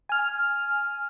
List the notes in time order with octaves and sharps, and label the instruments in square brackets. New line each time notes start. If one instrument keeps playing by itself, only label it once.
[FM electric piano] G#5 F6